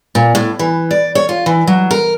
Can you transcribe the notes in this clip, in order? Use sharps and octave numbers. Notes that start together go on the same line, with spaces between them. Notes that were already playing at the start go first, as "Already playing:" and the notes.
A#2
A2
E3
D5
C#5
F4
E3
F#3
A#4